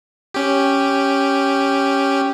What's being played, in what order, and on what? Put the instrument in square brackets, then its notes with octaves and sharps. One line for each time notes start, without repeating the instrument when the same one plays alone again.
[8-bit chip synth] C#4 G4